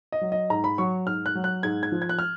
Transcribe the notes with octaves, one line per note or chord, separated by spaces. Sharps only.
D#5
F#3
D#5
G#2 A#5
B5
F#3 C#6
G#2 F6
F#6
F#3
F#6
G#2 G#6
G#6
F3
G#6
F#6
F6